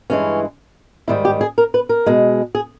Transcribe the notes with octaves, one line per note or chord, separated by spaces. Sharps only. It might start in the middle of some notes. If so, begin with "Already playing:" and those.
G2 E3 G#3 C#4
G#2 D#3 G3 E4
G4
G#4
A#4
B4
A#4
B2 G#3
G#4